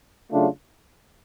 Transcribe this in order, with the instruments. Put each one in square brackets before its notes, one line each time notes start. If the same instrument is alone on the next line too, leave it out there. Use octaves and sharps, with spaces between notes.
[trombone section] C#3 F#3 A3 D4 F4